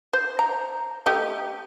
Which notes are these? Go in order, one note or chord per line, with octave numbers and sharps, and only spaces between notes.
C5
A#5
A3 G4 D#5